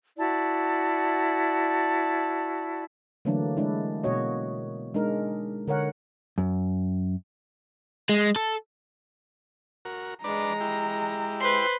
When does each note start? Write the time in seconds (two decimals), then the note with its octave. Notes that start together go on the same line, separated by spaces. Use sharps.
0.18 E4 F#4 D5 A5
3.25 D3 E3 F#3 A3 A#3 D4
3.57 G#3 D4 E4
4.03 B2 A#3 F#4 C#5 D#5
4.94 G#3 D4 D#4 A#4
5.68 D3 A#4 C#5 F#5
6.38 F#2
8.09 G#3
8.36 A4
9.85 F#4 A#4
10.24 G#3 D4 B4 D5 A#5
10.61 E4 G4
11.40 B4 C5 C6